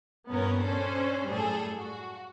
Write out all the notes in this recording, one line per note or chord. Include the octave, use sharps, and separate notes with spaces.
G2 A#2 B3 C#4 A#4 C#5
C#4 D4 A4 C5
F#2 A2 G3 G#4 A4
F#4